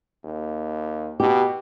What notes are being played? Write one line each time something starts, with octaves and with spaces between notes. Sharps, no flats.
D#2
B2 G4